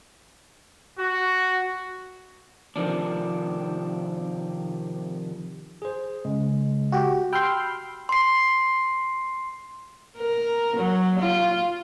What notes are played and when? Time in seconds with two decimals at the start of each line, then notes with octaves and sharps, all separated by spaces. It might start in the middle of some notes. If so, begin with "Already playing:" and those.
0.99 F#4
2.76 C3 D#3 F3 D4
5.82 G#4 C5
6.25 C#3 G#3
6.92 F#4 G4
7.33 G5 B5 C6 E6 F6
8.09 C6 C7
10.18 A#4
10.76 F#3
11.19 F4